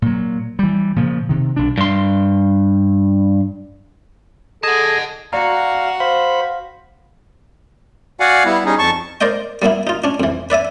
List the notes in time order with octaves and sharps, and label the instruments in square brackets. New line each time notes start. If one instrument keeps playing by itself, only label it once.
[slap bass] A#2 F#3
E3 G3
A#2 C#3 F3
C3 D#3
B1 D4
[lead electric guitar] G2 C6
[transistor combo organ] G#4 D#5 [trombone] A4 [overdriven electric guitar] F#5 A5
[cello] F#4 [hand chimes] D5 A#5 [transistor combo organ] F5
[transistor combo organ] C5 B5 [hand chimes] F5
[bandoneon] F#4 D5 F5 F#5 G#5
G3 B3 E4
G3 C#4 D#4 G#4
F2 A5 C#6
[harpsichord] A#4 C5 D5 D#5 G5
G3 A#3 B3 E4
D#4 F4
C#4 D4
F2 E3
B4 D5 E5 G#5